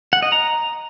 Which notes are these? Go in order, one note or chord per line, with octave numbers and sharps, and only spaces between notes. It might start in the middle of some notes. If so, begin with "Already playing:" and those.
F#5
D#5
A#5